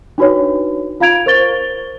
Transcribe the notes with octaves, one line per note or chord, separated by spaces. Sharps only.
D4 D#4 F#4 B4 C#5
F4 F5 A#5 G#6 D7 F7
A#4 C5 C#6 A6 G7